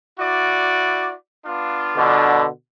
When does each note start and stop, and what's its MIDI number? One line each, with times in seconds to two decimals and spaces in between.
0.19 1.13 64
0.19 1.13 66
0.19 1.13 74
1.46 2.38 59
1.46 2.38 62
1.46 2.38 65
1.97 2.46 47
1.97 2.46 50